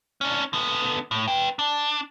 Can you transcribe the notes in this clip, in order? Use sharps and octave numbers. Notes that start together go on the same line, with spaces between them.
C#4 D4
D3 B3
A2
B4 G5
D4